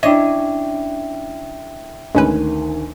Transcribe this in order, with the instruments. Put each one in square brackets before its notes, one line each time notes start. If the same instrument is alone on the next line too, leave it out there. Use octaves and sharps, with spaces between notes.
[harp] C#4 D4 E4 [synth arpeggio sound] C#5 D#5 D#7 [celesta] E5 G5
[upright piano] D2 D#3 G#5 [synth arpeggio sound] G#3 C#4 B4